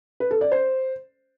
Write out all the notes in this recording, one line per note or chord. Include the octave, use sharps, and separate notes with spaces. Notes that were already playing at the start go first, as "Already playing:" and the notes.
B4
A4
D5
C5